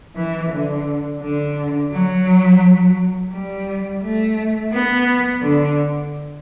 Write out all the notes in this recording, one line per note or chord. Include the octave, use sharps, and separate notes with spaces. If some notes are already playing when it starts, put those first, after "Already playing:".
E3
D3
D3
F#3
G3
A3
B3
D3